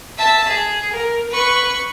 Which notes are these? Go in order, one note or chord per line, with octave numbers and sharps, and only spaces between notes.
E5 A5
G#4
A#4
B4 C#6